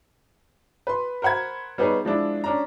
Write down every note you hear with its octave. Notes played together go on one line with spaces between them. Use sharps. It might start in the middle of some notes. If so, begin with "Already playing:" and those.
B4 C6
A#4 C5 F#5 B5 G#6
G3 B3 D#4 G#4 B4 C#5
F3 G#3 D4 E4
C#4 D4 A#5